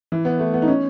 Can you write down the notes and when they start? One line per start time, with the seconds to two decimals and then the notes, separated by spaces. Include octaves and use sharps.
0.12 E3
0.25 B3
0.39 A3
0.54 B3
0.62 D#4
0.68 C#4